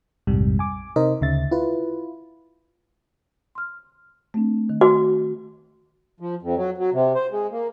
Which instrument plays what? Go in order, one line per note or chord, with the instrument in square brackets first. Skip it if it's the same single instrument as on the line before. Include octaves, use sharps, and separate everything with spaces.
[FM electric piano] A#1 F2 G#2 C3 G3
G#5 D6
C3 D#4 A#4 C5 D#5
D2 C#3 E5 A6
E4 F4 B4
[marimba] C6 F6
A3 C4 D4
D#3
[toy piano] F#4
[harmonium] F3
F2
F#3
F#3
C3
C5
G#3
A#3